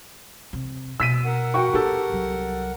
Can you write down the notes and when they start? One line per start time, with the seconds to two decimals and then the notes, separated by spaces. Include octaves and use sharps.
0.53 C3
1.00 B2 E6 B6 D#7
1.25 A#4 F#5
1.54 F#4 G5 C#6
1.73 B3 G4 A4
2.10 C2 F#3